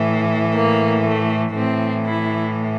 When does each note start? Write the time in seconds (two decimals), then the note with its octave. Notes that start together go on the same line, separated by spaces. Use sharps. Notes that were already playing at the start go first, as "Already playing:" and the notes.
Already playing: A2 E3
0.54 A#3
1.04 A3
1.55 A2 E3 C4
2.06 E4